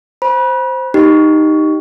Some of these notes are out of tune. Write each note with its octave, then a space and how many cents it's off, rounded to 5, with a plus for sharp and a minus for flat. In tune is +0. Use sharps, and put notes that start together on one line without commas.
C5 +0 B5 -35
D#4 +0 G4 +0